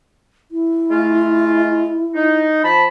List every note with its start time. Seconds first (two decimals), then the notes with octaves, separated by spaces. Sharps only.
0.51 E4
0.91 G#3 A3 F4
2.15 D#4
2.63 F3 A5 B5